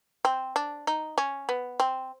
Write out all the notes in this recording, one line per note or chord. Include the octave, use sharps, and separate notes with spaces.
C4
D4
D#4
C#4
B3
C4